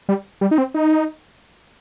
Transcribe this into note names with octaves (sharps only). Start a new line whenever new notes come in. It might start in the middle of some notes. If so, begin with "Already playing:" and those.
G3
G3
D#4
C4
D#4